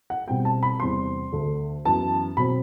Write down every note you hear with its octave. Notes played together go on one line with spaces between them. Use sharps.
F#5
B2 G3 C4 G5
A5
B5
E2 C3 G3 C4 C6
D2 D3 A3
F#2 E3 B3 A5
B2 F#3 C4 B5